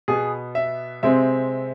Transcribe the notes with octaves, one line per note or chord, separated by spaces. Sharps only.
B2 B3 G#4
E5
C3 G#3 C4 E5